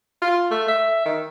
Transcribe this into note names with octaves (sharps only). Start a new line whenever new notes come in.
F4
A3
E5
D#3